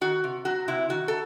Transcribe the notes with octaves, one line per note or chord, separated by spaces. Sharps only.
D#3 F#4
C3
F#3 F#4
C3 E4
D#3 F#4
A4